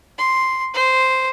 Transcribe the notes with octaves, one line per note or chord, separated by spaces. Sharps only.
C6
C5